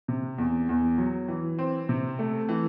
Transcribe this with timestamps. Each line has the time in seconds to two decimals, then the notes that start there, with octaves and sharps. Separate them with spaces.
0.08 C3
0.38 E2
0.69 E2
0.98 F#3
1.28 E3
1.59 C4
1.89 C3
2.19 A3
2.49 E3